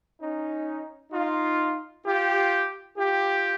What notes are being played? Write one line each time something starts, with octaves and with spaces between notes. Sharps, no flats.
C#4 D#4
D#4 F4
F4 G4
F4 G4